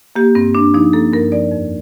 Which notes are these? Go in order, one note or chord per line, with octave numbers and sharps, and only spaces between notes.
A#3 G4
G2 C4
G2 D4
F3 D#4
A#3 A4
G2 A#4
F3 D5
F2